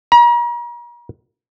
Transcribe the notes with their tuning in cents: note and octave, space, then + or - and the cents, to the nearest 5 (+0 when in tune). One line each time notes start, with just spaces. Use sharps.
A#5 +40